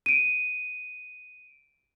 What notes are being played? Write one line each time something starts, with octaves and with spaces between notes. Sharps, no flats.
D7 D#7